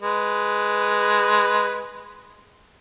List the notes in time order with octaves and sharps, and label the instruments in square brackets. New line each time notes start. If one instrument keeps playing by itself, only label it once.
[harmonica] G#3 B4